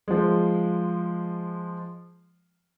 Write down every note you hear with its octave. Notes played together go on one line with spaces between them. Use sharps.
F3 G#3